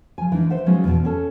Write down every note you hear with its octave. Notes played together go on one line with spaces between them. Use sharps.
F3 G#5
E3 D4 D#4
B4 C5 E5 F#5
F3 F#3 G#3 B3 C#4 D#4
E2 B2
B3 C#4 A4